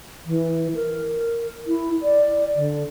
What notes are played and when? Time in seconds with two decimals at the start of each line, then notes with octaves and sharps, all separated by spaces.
0.26 E3
0.75 A#4
1.67 E4
2.03 D5
2.56 D3